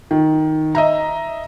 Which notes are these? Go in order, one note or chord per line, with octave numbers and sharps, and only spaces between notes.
D#3
D#5 E5 A#5